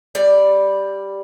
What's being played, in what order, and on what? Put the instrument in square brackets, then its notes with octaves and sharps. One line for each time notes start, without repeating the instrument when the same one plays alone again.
[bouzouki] G3 D5